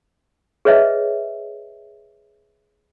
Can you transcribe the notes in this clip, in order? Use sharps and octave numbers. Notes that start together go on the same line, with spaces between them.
G#4 B4 C#5 D#5 E5